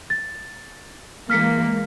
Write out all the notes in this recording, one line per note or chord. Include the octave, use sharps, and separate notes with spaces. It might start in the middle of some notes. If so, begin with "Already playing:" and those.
A6
E3 G#3 A#3 F6 B6 C#7